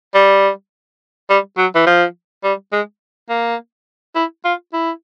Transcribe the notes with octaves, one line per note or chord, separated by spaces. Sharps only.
G3
G3
F#3
E3
F3
G3
G#3
A#3
E4
F4
E4